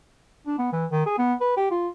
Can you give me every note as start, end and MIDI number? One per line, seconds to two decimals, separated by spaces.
0.46 0.57 62
0.58 0.69 59
0.73 0.86 52
0.91 1.02 51
1.06 1.14 68
1.18 1.34 59
1.41 1.54 71
1.57 1.67 67
1.71 1.88 65